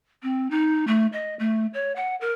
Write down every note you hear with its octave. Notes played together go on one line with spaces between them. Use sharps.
C4
D#4
A3
D#5
A3
C#5
F#5
A#4